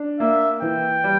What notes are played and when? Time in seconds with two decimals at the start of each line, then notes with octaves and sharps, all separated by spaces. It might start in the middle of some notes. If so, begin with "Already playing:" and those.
Already playing: D4
0.20 A#3 E5
0.62 E3 G5
1.04 G3